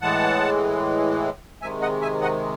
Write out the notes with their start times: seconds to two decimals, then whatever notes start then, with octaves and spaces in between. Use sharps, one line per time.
0.02 A2 E3 G#3 F#5 A5
1.62 C3 D#3 G#3 E5 G#5
1.82 D#5 F#5
2.02 E5 G#5
2.21 D#5 F#5